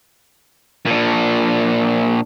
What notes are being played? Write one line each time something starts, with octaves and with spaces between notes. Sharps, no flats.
A#2 D4